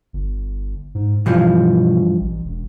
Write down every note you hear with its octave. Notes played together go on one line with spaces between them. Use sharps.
G1
G#2
G2 B2 E3 F3
A1
E1